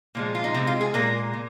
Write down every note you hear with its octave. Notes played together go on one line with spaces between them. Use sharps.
A#2 F3 G#3
F4
D#4
C3 G#3 C4
F4
G#4
A#2 G#3 A#4
A#2